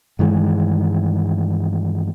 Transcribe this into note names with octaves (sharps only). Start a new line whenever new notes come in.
G2 D#3 E3 G#3